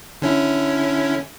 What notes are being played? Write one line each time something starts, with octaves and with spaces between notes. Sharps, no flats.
D3 C#4 E4